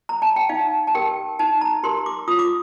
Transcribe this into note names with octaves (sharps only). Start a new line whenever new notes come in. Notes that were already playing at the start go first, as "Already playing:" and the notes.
A#5
A5
G5
D#4 F5
A5
G4 A#4 G5
D#4 A5
A#5
G4 A#4 C6
D6
F4 D#6
D6